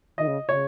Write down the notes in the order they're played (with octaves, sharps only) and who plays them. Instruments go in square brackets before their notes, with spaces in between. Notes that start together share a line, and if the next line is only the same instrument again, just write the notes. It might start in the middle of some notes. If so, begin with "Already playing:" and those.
[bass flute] D#3 [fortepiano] D#5
[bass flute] C#3
[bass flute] C#3 [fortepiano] C#5